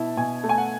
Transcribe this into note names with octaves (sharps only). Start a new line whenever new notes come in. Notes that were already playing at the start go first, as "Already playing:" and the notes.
Already playing: B2 E4 A5
B2 G#5
A3
G#5
F#5